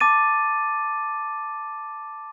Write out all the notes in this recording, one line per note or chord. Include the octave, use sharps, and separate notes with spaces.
A5 D6 A6 D#7